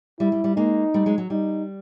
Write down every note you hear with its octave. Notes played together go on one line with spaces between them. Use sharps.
G3 E4
G3
G3
G#3 A#3 D#4
G3 A3
F#3 G#3
F#3
G3 D#4